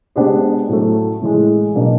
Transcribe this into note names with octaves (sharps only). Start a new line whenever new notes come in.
G#3 B3 D4 G4 C5
A2 F#3 A3
A2 E3 G#3
B2 F#3 A#3 D4